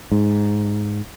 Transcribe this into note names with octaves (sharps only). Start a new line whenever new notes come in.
G#2